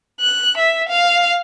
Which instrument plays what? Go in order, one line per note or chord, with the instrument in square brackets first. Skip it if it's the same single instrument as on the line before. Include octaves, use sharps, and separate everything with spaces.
[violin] F#6
E5
F5